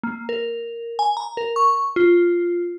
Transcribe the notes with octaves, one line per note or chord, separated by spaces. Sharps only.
A#3
A#4
G#5
A#5
A#4
C#6
F4